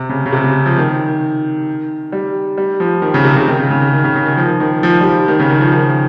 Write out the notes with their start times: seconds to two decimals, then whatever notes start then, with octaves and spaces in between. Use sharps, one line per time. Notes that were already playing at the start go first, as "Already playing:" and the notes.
Already playing: C3
0.09 C#3
0.26 C#3
0.33 C3
0.44 C#3
0.66 F3
0.78 D#3
2.12 G3
2.58 G3
2.80 F3
3.02 D#3
3.14 C#3
3.25 C3
3.36 C#3
3.47 D#3
3.59 C#3
3.70 C#3
3.82 C#3
3.93 D#3
4.04 C#3
4.15 C#3
4.26 D#3
4.37 F3
4.60 D#3
4.83 F3
5.00 G3
5.05 F3
5.28 D#3
5.39 C#3
5.51 D#3
5.61 F3
5.72 D#3